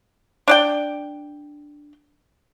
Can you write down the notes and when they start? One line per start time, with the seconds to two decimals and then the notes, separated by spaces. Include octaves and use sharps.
0.48 D4 D5 G5